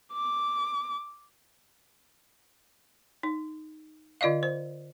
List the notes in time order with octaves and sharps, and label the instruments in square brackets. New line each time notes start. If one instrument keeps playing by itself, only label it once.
[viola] D6
[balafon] D#4
D3 F4 D5 D#5 F5
C5